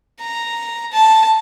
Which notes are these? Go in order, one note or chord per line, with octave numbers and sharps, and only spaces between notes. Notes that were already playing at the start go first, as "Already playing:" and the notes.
A#5
A5